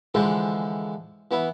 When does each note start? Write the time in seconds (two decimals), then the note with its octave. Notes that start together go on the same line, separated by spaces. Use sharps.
0.14 D3 E3 F3 G#3 A4 C5
1.31 E3 B3 E4